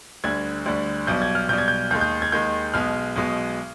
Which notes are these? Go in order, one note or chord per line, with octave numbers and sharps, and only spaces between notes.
D2 D3 G3 G#6
D2 D3 G3
B1 B2 G3 G6
G#6
F6
B1 B2 G3 G6
G#6
G6
D#2 D#3 G#3 G6
G6
G#6
D#2 D#3 G#3 G6
B1 B2 G#3 F6
B1 B2 G#3